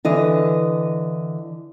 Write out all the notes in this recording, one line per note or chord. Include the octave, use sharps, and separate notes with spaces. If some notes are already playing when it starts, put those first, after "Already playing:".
D3 E3 D#5